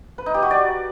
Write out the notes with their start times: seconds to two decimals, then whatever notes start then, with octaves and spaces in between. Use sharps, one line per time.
0.18 B4
0.26 D#4
0.34 G4
0.42 F#4
0.51 D5